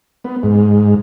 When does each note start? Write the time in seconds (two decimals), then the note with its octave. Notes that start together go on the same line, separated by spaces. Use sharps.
0.24 B3
0.43 G#2